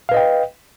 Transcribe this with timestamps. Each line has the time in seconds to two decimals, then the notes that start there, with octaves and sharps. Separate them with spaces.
0.09 F5
0.12 B4
0.14 D#5
0.17 G5